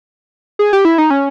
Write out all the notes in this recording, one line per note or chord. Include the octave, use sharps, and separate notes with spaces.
G#4
G4
E4
D#4
C#4